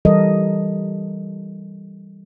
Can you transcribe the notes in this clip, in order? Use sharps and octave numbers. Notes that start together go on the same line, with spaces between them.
E3 G3 A4 A#4 D#5